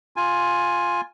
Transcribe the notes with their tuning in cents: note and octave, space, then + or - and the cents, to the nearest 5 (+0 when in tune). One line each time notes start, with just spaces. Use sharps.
F4 +5 G#5 +0